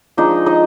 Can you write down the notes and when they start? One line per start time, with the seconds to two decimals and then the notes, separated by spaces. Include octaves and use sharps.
0.17 F3 G#3 D4 D#4 D#5
0.46 D#4 D#5